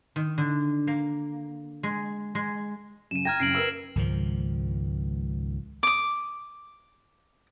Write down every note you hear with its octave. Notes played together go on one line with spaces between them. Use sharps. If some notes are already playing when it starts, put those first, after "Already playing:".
D#3
D3
A#3
G#3
G#3
F#2 C#3 D#7 E7
G5 A#5 F6 G#6 A#6
F#1 C#3 C7 D7 F#7
A#4 B4 E6
C#2 G#2 D#3 F3
D6 D#6